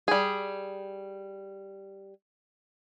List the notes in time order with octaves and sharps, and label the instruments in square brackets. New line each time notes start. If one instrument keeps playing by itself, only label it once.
[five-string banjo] G3 G#4